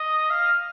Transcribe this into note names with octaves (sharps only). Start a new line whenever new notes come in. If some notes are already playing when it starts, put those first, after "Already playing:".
Already playing: D#5
F5